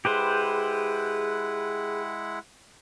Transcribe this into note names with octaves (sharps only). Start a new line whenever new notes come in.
G#3 E4 G4 G#4 B4 C5 F#5